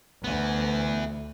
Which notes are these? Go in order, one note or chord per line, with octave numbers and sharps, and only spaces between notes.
D2 E3 B3